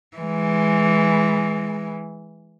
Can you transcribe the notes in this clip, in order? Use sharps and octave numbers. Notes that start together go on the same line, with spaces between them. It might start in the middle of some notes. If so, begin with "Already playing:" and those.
E3 G#3